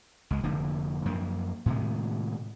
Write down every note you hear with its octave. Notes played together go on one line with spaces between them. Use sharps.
C#2 G#3
F1 D3 F3 A#3
F#2 F3 A#3
A2 C3 D#3 G#3